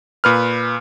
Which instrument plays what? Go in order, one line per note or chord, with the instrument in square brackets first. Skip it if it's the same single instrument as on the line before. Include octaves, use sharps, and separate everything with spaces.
[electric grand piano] A#2 B4 F6